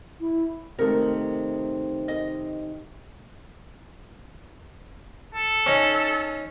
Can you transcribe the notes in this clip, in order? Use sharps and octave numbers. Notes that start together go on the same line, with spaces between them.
E4
C3 D#3 A3 A#4
D#5
A4
C#4 D#4